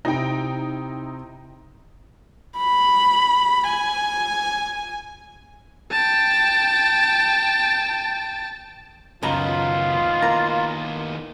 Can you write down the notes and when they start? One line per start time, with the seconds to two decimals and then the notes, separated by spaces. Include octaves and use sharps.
0.05 C3 D#4 E4 G5 A#6
2.57 B5
3.68 G#5
5.91 G5 A5
9.23 C#2 F#2 D#3 B3 F4 A#5
10.22 A#3 E4 A#5